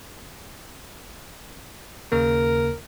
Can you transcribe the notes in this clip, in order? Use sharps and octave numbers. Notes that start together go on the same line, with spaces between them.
D#2 C#3 A#3 A#4